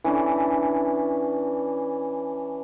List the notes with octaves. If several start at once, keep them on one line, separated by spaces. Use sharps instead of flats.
E3 C#4 D4